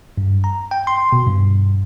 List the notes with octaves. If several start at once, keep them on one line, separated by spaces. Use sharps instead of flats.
G2
A#5
G5
C6
B2
G2